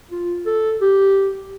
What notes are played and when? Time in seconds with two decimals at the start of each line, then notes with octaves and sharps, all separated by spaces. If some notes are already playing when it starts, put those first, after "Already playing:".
0.11 F4
0.46 A4
0.81 G4